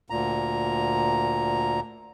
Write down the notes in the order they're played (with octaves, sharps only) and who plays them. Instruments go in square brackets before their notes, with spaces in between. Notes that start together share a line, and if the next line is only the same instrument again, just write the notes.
[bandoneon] D2 A#2 A#5